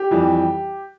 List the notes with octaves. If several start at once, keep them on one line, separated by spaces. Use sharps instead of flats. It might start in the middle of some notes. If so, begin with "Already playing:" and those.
Already playing: G4
F2 E3 G3